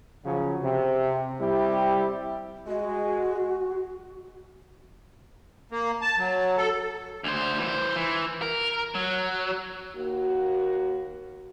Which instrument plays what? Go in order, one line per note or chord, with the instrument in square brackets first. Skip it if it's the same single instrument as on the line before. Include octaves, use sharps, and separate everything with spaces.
[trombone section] C#3 F3 F#3
C3
G3 C4 E4 G4
[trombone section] G#3 [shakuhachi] F#4
[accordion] A#3
A5
F#3
A4
[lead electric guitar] D2 C5
E3 C5
E3
A#4
F#3
[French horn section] D#2 A#3 F#4